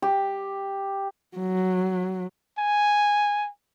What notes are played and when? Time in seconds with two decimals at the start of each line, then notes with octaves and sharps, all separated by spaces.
0.02 G4
1.37 F#3
2.59 G#5